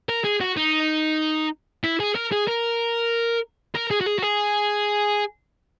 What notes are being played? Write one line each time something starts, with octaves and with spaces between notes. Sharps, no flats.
A#4
G#4
F#4
D#4
E4
G#4
A#4
G#4
A#4
A#4
G#4
F#4
G#4
F#4
G#4